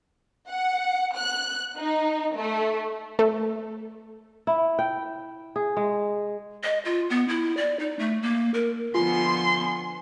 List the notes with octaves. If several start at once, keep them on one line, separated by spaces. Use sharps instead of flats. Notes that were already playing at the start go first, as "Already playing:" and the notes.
F#5
F#6
D#4
A3
A3 A4
E4
G5
G#4
G#3
D#5
F4
B3
E4
D5
D#4
A3
A#3
A#4
D3 F3 B3 F4 G#5 C6